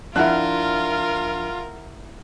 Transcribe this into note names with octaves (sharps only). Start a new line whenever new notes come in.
F3 D4 E4 F4 A#4 F#5 F#6